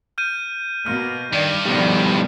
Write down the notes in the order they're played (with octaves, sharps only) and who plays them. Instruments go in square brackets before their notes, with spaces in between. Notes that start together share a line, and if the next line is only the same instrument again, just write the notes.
[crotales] F6 G6 D#7
[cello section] B2 A#3 [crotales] F6
[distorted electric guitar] G2 [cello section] D#3 D5
[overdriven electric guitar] B2 G3 [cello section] D#3 F3 D5